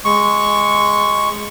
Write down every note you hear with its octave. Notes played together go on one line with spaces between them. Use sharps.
G#3 C#6